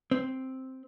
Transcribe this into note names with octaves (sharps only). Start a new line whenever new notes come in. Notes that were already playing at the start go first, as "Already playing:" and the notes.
C4